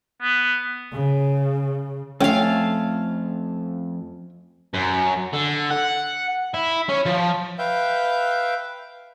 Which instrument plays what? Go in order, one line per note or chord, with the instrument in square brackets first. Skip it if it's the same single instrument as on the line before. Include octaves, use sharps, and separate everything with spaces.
[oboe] B3
[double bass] C#3
[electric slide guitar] F2 [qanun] A3 F5 [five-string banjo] C#4 G5
[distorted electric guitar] F#2
D3
F#5
E4
C#4
F3
[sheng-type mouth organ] B4 E5 F5 G5 G6